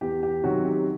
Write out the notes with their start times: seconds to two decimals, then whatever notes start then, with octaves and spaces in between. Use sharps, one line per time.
0.01 E2 G4
0.23 G4
0.44 C3 D#3 F#3 F#4
0.65 G4